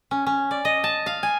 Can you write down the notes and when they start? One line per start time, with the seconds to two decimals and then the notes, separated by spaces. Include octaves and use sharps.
0.11 C#4
0.26 C#4
0.51 D5
0.65 D#5
0.84 A5
1.06 F5
1.23 G#5